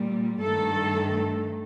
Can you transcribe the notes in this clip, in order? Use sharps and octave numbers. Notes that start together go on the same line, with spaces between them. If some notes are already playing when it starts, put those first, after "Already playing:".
Already playing: A#2 G3
G2 D#3 A3 A4